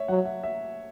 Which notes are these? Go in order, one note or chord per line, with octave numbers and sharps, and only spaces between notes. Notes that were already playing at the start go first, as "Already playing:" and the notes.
Already playing: C#5 E5
F#3 F#5
E5
E5